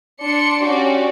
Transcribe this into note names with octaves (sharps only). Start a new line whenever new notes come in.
D4 C6 C#7
C#4 F#4 G4 D5